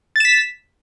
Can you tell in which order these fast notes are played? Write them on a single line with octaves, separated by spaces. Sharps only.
A6 E7 B6